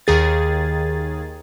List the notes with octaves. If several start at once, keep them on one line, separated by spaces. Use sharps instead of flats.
D#2 D#3 G#4 A6